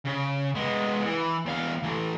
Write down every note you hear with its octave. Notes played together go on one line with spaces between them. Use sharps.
C#3
G#3 B3
E3
E2 F5
E3 A3